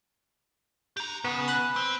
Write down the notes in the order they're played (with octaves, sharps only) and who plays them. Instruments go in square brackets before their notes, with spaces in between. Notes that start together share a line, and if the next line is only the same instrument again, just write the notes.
[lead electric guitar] G4 A#5
[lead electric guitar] C#3 [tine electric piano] B3
[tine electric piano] B5 F#6
[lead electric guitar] C4